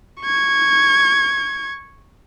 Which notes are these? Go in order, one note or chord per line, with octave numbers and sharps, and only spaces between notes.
C#6 G#6